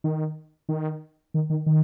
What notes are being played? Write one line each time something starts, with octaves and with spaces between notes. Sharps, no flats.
D#3
D#3
D#3
D#3
D#3